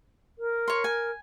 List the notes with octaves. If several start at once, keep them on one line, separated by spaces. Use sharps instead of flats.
A#4
C#5 C6
G#5